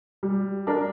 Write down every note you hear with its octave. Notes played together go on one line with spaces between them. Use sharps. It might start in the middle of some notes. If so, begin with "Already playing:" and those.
G3
D4 A#4